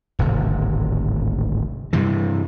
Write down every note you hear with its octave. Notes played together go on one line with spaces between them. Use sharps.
D1 G#1 C3
G2 C3 E3